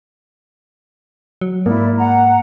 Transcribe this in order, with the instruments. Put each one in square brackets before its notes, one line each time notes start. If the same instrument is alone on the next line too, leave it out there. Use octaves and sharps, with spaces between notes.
[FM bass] F#3
[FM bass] G#2 [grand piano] A#3 [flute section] E4 D5
[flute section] F#5 A#5